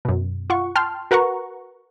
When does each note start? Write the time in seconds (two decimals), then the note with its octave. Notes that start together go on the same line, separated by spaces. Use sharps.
0.05 F#2 B2
0.50 F4 F#5 C#6
0.76 G5 A5 C6 F6
1.11 F#4 A#4 B4 F#5 A#5 C#6